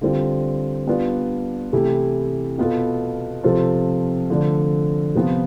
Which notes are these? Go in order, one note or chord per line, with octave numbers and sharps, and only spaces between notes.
D3 G3 C4 F4
G3 B3 D4 F4 B4
C3 E3 A3 E4 G4
B2 B3 F4 A4
C3 F3 C4 F4 A4
D3 F3 A3 D4
C3 F3 B3 F4